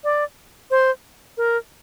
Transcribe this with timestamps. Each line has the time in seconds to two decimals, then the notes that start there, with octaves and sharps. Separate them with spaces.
0.04 D5
0.71 C5
1.37 A#4